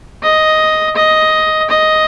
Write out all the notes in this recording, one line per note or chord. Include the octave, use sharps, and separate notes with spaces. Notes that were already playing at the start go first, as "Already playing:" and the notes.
D#5
D#5
D#5